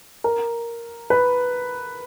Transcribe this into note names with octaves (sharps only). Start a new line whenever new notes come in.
A#4
B4